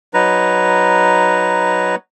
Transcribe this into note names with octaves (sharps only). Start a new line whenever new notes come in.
F#3 D#4 B4 A#5